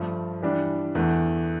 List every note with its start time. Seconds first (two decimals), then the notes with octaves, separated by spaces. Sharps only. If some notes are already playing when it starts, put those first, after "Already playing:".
Already playing: G2 F3 A3
0.42 E3 G3 D4
0.95 E2 E3 A3